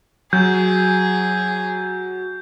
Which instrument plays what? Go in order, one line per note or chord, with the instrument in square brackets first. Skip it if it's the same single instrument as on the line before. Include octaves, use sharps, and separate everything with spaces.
[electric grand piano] F#3 [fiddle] G#4 [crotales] G6